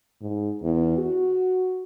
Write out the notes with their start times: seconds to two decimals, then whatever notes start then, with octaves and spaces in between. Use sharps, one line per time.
0.22 G#2
0.63 E2
0.98 F#4